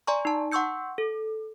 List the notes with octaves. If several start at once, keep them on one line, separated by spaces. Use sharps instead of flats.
D5 G#5 A#5 C6 C#6
D#4 A5
F#5 C6 C#6 E6 G6 C#7
A4